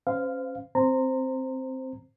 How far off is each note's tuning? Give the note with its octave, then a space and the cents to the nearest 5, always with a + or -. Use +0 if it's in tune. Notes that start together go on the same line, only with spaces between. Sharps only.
C#4 -25 C5 -35 F5 +0
C4 +0 C5 +0 A#5 -20